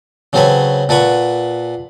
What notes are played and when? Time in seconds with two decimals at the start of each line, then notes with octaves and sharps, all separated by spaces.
0.33 C#3 F#3 C4 A4 B4 C#5
0.89 A#2 A4 B4 F#5 C#6